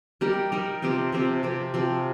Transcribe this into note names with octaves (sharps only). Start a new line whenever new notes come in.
G3 D#4 G4 A#4
G3 D#4 G4 A#4
C3 F3 C4 G4
C3 F3 C4 G4
C3 F3 C4 G4
C3 F3 C4 G4